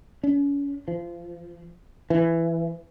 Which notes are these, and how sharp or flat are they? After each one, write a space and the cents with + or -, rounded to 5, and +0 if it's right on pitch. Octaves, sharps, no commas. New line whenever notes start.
C#4 +35
F3 -25
E3 +10